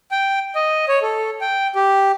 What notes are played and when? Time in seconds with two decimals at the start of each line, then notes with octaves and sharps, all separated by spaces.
0.11 G5
0.55 D#5
0.88 C#5
1.02 A4
1.41 G5
1.75 G4